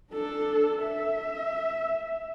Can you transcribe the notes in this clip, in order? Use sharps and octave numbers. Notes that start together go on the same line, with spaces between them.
D4 A4
E5